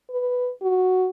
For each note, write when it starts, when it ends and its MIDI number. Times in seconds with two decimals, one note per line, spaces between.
0.10 0.50 71
0.62 1.08 66